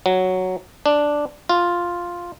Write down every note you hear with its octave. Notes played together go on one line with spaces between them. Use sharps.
F#3
D4
F4